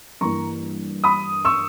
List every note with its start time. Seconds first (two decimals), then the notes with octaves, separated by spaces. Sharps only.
0.21 G2 E3 A#3 A#5 C#6
1.04 B5 D#6
1.45 C#6 E6